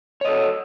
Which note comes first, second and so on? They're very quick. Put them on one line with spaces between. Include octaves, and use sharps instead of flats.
C#5 D#5 A4